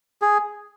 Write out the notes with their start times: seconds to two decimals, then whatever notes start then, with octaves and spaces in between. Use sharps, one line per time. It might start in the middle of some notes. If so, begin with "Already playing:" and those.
0.22 G#4